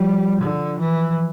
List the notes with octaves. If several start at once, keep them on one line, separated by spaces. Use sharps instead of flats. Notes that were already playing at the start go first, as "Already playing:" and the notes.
Already playing: F3 G3
D3
E3